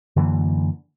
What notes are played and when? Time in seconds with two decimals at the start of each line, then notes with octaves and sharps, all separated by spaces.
0.16 F#2 D3 E3 A#3